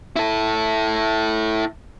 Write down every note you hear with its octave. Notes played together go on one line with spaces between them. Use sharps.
E4 A4